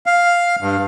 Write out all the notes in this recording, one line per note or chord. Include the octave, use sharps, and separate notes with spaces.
F5
G2